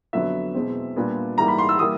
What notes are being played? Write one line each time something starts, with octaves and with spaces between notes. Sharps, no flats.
F2 D3 F#3 B3 E5
E2 B2 G#3 C4
A#2 G3 B3 D4 F4
G#2 E3 G3 A#3 A#5
B5
C6
E6
E3 G3 A#3 D#6